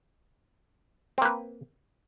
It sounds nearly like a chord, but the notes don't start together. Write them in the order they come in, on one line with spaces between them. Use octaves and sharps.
C4 A#3 B4